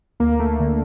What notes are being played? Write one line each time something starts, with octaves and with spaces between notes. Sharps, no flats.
D2 A#3
A3
D3